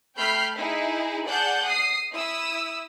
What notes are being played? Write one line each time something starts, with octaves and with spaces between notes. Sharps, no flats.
A3 G5 B5 F6 G6 C7
D#4 E4 G#4
G#4 D5 F#5 A5 G6
D#6 C7
E4 D#6 E6